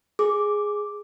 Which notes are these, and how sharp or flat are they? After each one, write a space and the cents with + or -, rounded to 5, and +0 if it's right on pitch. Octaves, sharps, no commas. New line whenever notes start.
G#4 +0 D6 +0